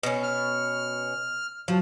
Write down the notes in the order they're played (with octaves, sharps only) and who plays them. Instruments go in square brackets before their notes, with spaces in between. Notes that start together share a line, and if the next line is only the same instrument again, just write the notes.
[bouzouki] B2 C#4
[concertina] F6
[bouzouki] F3 [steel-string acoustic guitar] F#3